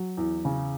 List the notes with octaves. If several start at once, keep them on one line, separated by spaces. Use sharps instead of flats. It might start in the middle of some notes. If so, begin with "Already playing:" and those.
Already playing: F#3
E2
C#3